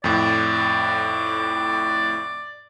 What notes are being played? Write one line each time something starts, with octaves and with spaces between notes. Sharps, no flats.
F2 A2 D5